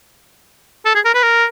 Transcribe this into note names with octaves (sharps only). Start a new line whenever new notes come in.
A4
G#4
A#4
B4
A#4